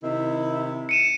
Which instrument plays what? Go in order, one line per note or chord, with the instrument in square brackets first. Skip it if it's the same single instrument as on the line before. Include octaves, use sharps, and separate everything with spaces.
[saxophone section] C3 D#3 E4
[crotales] C#7 D#7 E7